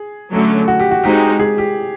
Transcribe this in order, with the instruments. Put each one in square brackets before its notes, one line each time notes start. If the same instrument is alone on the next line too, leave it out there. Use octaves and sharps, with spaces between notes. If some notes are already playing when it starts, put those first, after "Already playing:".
Already playing: [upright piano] G#4
[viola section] D3 F#3 A3 C#4
[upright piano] F#4
G4
F#4
[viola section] G#3 C4 D#4 F#4 [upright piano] G4
[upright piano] G#4
G4